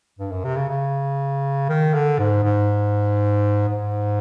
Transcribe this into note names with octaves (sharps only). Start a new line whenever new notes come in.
G2
F#2
C3
C#3
C#3
D#3
D3
G#2
G#2
G#2